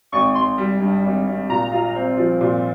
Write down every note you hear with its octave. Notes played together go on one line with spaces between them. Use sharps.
G#1 C#6
G#1 C6
G3
G2
G#1
G#1
A#2 A#5
F4
C4
F3
A#2